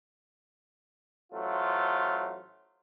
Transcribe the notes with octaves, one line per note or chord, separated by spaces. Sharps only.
A1 F#3 A3 F4 C5